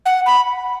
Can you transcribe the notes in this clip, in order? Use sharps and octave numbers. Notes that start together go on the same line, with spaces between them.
F#5
B5